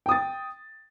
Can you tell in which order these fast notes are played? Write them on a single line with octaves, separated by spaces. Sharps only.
G5 D#6 A6